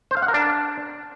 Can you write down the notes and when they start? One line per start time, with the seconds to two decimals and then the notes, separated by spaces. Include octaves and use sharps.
0.11 C5
0.17 F5
0.22 F#5
0.28 A#4
0.34 D4